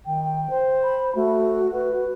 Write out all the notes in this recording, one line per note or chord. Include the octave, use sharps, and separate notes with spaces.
D#3 G5
C5
B5
A3 F#4
B4